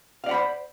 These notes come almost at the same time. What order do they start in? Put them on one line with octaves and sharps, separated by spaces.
F5 D5 F#5 B5 C5